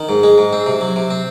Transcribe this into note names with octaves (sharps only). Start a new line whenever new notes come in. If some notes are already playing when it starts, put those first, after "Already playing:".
Already playing: D#3
G#2
G#3
G#2
C4
C3
F#3
C3
C4